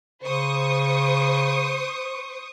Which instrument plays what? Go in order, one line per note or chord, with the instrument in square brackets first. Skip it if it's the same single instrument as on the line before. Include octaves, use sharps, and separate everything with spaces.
[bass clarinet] C#3 [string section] C5 C#6 D#6